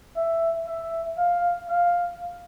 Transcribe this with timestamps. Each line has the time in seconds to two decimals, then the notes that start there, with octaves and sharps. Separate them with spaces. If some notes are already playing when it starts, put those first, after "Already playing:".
0.16 E5
0.67 E5
1.18 F5
1.69 F5